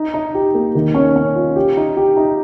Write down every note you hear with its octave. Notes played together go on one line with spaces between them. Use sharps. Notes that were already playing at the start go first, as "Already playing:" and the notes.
Already playing: D#4
D#4
G4
A#3
D#3
C#4
C#4
F4
G4
D#4
G4
D#4